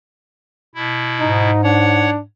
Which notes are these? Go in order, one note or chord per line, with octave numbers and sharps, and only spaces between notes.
B2 E4
G#2 D#4
D4 C#5 F#5